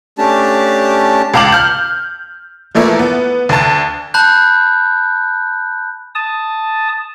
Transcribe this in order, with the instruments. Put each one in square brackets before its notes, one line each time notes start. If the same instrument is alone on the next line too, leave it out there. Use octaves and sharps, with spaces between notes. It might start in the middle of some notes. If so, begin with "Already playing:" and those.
[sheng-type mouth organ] A3 C#4 D4 G4 A5
[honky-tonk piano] C#2 F5 A5 D6 F#7
F6 G6
E3 F3 A3 A#3 E4
B3
D2 A5
[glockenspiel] A5 B5 F#6 G6
[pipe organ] A5 D#6